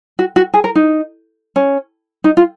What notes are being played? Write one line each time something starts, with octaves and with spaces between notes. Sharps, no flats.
F#4
F#4
G#4
A#4
D#4
C#4
D#4
F4